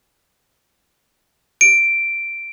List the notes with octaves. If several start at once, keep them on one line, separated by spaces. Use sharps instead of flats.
D7